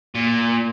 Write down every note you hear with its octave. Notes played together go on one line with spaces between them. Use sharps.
A#2